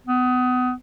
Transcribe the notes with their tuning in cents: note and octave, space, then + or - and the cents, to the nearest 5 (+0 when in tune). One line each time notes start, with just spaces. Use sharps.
B3 +30